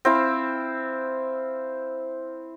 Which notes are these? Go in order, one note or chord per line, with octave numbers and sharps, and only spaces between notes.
C4 E4 F5